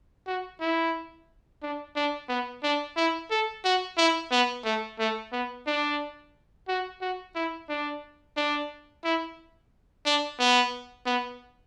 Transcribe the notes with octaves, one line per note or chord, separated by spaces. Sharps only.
F#4
E4
D4
D4
B3
D4
E4
A4
F#4
E4
B3
A3
A3
B3
D4
F#4
F#4
E4
D4
D4
E4
D4
B3
B3